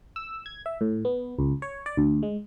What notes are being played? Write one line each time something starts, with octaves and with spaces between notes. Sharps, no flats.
E6
G#6
E5
A2
B3
C#2
C#5
D5
D2
G#3